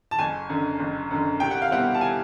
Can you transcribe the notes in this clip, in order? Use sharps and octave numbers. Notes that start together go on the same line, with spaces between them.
A5
F#1 G#5
F#2 D3
F#1
F#2 D3
C2 G5
F#5
F5
B2 G3 C4 E4 F#5
A5
G#5